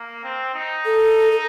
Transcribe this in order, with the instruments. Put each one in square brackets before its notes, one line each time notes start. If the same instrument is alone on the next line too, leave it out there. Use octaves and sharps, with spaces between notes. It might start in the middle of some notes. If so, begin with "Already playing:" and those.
Already playing: [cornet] A#3
C4
D#4
[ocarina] A4
A4